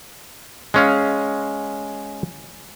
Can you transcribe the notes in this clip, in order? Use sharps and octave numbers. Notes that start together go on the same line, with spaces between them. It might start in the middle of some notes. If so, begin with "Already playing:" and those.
G#3 C#4 F5